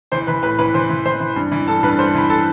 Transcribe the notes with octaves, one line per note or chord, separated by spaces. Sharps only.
E3 C5 C6
E3 B4 B5
A2 B4 B5
E3 B4 B5
E3 C5 C6
E3
E3 C5 C6
E3
G2
E3
G2 A4 A5
G2 B4 B5
G2 C5 C6
E3 B5
A4 A5